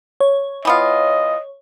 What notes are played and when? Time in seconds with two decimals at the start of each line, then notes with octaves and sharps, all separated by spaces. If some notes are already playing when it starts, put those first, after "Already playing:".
0.20 C#5
0.65 E3 B3 F4 D#5